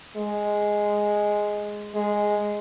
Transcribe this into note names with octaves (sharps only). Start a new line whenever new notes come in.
G#3
G#3